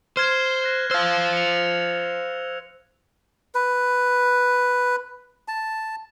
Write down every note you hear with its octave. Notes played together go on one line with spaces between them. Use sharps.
C5 F6 G#6 E7
F#6 A#6
C5 F5 E6 F6 E7
C#7 F7
B4
A5